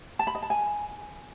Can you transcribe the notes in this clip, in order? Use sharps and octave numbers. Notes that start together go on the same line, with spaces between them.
A5
B5
D#5
A5
G#5